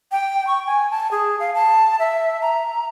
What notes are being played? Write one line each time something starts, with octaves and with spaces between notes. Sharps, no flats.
G5
C#6
G#5
A5
G#4
F5
A5
E5
A#5